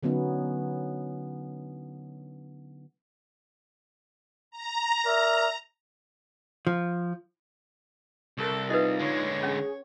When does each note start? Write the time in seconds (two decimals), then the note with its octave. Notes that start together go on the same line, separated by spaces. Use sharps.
0.03 D3 F#3 B3 C#4 D#4
4.51 A#5
5.06 A#4 D5 E5
6.67 F3
8.38 C2 A4 A#4
8.70 D#4 F4 G#4 B4 D#5
8.99 D3 G#3 C#5
9.43 C#4 G#4